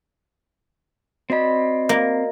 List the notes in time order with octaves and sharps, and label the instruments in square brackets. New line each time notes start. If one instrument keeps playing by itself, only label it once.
[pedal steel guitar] C4 B5 [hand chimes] F#4 D5 D#5
[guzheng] A#3